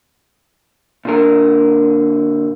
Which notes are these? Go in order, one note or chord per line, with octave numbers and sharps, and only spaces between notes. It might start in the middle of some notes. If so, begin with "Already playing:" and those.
A#2 D3 A#4